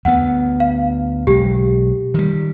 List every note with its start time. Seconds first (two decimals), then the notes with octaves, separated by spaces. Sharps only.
0.05 D2 B3 F#5
0.60 F5
1.27 B1 G#3 G4
2.14 D#3 G3